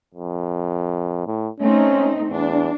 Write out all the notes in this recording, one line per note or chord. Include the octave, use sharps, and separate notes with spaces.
F2
A2
A3 C4 C#4 D#4
E2 D4